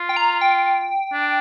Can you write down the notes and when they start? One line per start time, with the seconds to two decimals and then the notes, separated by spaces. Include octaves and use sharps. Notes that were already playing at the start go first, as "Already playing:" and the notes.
Already playing: F4
0.09 G5
0.17 A#5
0.41 G5
1.13 D4